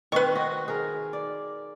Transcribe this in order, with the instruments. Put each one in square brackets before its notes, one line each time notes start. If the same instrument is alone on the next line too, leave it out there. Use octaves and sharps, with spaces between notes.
[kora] D#3 C4 [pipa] B4 C#6
[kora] F#4 D#5
G#4 A#4
D5